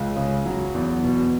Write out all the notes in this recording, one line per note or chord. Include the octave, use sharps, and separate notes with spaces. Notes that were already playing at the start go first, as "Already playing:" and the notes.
Already playing: C#2
C#3
F#3
E2
B2